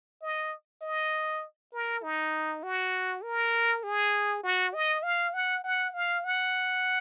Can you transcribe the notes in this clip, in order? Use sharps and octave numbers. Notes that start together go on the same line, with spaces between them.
D#5
D#5
A#4
D#4
F#4
A#4
G#4
F#4
D#5
F5
F#5
F#5
F5
F#5